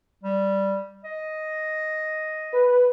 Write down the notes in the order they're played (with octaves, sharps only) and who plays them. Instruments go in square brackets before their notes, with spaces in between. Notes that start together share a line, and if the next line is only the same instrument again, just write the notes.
[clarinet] G3
D#5
[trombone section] B4